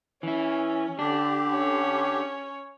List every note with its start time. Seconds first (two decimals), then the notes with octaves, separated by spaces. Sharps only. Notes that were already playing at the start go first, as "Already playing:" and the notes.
0.23 E3 C#4 E4
0.99 D3 D4 G4
1.51 C#4 C#5